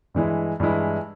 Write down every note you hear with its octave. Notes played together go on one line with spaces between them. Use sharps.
G2 E3 G#3 E4
G2 E3 G#3 E4